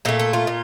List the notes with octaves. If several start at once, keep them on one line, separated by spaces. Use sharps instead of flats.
A#2 A3 A4
A4
F4
A#2